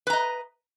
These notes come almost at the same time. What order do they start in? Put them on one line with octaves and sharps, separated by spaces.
B4 A#5 D#5